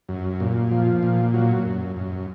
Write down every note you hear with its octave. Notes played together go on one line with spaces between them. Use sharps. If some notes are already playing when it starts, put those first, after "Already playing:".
F#2
A#2
F3
A#2
F#3
F#2
F#2